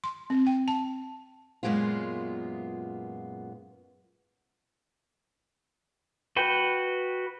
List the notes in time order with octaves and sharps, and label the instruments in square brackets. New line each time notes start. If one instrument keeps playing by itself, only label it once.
[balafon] C6
C4
G5
A5
[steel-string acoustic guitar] F#2 A#2 G#3 B3 F4
[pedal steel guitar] F#4 B4 G5